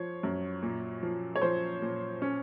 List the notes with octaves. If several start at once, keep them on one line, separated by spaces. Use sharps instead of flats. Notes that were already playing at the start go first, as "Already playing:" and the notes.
Already playing: F3 C5 C#5
F#2
A#2
F3
C#5
F3 C5
A#2
C#4